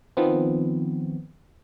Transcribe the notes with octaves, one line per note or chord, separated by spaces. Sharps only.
D#3 F3 B3 C4